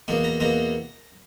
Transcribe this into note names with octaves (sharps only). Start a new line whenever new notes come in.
E2 B2 A#3
A#5
E2 B2 A#3 A#5